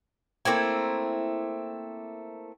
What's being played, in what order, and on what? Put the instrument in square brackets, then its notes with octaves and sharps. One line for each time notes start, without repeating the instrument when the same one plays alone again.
[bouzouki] A3 A#3 C4 E4